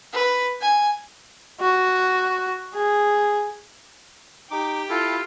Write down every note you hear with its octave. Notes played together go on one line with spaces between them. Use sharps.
B4
G#5
F#4
G#4
D#4 G4 D6
E4 F4 A4